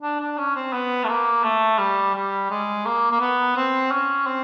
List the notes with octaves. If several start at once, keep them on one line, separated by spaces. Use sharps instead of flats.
D4
D4
C#4
C4
B3
A3
A#3
A3
G3
G3
G#3
A#3
A#3
B3
C4
C#4
C4